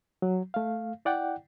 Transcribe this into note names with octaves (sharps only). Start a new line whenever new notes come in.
F#3
A3 F5
E4 D5 F#5 G5